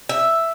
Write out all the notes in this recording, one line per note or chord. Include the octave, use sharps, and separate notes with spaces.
E5